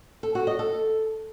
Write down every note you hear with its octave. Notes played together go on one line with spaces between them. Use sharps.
A4
F#4
D#5
A4